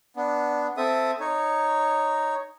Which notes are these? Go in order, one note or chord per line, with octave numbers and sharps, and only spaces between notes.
B3 D4
C4 A4 E5 D#6
D#4 C#5